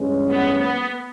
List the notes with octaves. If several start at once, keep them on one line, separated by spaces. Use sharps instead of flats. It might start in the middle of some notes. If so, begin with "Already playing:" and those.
Already playing: G2 E3 G#3 C#4
B3
B3